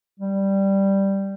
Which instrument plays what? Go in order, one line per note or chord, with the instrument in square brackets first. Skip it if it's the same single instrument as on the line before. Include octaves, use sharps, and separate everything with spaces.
[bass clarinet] G3